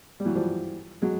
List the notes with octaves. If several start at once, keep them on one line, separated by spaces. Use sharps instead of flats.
G3
E3 F#3
F3 G3
F#3 G#3